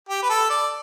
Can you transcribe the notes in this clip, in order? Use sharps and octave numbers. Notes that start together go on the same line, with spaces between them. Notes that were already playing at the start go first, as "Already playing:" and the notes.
G4
B4
A4
D5